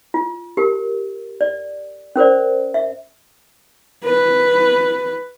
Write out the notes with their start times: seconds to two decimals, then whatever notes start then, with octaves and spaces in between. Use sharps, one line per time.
0.14 F4
0.57 G4 A#4
1.41 D5
2.16 C#4 A#4 C5 D5
2.74 E5
4.05 B4